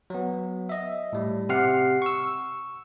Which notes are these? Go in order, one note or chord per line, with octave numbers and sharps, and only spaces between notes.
F#3 B3
D#5 E5
A2 G3
C3 G4 F#5 F6 C7
C#6 E6